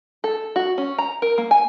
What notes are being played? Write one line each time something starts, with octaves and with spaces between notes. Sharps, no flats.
A4
F#4
C#4
A#5
A#4
A#3
G#5